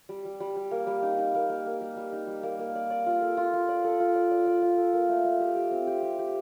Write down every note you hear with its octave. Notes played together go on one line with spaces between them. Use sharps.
G3
G3
G3
G3
A#3
G3
D#4
D#4
A#3
A#3
A#3
G3
G3
D#4
G3
A#3
A#3
D5
D5
F4
A4
F4
F4
D5
A4
F4
D5
D5
D5
F4
A4
A#3
A3
A3
G4
G4
C4
G4
G4
G4